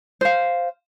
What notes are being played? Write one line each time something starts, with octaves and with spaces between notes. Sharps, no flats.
C5 F5